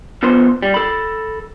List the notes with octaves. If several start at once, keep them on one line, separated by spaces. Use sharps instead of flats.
B2 F3 B3 A4 C5
G3
A4 B5